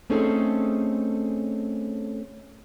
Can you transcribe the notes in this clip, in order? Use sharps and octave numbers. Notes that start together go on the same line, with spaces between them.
A3 C4 C#4 D#4 G#4 A4